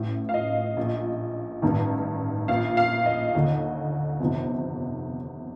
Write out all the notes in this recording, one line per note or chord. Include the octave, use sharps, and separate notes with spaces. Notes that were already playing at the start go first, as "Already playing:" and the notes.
Already playing: A1 A2
F5
D#5
A#1 A#2
A1 G2 D#3
A#1 A#2 F5
F5
D#5
D#2 D3
G1 F2 C3 D#3